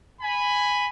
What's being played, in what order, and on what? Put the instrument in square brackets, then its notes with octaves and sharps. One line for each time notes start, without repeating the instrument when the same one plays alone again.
[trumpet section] G#5 B5